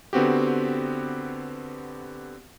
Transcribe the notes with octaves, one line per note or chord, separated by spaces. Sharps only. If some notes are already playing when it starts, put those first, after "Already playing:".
D3 B3 C4 F#4 G4